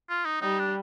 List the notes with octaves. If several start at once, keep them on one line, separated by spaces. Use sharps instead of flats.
F4
D#4
G3 D#4
D4